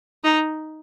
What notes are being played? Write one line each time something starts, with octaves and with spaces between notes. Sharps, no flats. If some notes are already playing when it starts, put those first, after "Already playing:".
D#4